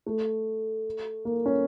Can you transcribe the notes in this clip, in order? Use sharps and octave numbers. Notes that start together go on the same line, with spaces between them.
A3
A#3
C#4